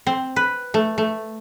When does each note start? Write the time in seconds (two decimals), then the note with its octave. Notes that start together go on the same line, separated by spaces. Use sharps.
0.07 C4
0.36 B4
0.74 A3
0.98 A3